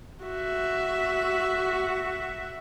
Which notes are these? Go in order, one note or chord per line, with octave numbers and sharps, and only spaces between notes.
F#4 E5